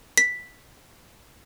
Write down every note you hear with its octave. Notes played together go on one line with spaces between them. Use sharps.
B6